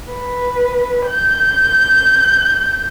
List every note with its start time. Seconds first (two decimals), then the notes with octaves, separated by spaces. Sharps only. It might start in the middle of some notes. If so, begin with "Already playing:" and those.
0.13 B4
1.06 G6